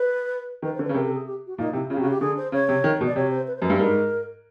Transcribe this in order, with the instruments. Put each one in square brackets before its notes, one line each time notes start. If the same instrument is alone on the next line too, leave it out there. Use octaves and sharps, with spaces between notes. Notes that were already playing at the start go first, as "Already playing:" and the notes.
Already playing: [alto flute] B4
[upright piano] D#3 [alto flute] B4
[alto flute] C5
[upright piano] D3
[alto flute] B4
[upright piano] C#3
[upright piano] C3 [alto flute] A#4
[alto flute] A4
G#4
G4
F#4
[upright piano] A#2 [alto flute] D#4
[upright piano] C3 [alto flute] E4
[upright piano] C#3 [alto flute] F4
[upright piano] C3
[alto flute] F#4
[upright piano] C#3
[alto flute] G4
[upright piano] D3 [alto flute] G#4
[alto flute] C5
[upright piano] C#3 [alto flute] C#5
[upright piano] C3
D#3
B2
[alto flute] D5
[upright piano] C3 [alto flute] C#5
[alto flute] C5
B4
C5
[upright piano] F#2 [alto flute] B4
[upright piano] G2
[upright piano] G#2 [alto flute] A#4